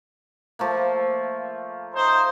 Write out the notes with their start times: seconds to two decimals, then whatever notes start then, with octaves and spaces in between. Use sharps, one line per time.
0.59 F3 A3 A#3
1.95 D#4 C5